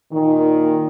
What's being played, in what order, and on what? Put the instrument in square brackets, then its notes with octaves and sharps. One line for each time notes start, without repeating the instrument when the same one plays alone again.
[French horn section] A#2 D#3